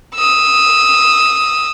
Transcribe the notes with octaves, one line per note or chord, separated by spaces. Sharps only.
D#6 E6